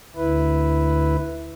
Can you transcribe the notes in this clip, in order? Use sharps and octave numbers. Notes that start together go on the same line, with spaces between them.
D2 E4 B4